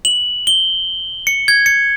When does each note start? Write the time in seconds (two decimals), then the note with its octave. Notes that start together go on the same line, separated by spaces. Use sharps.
0.05 F#7
0.47 G7
1.27 C#7
1.48 G#6
1.66 C#7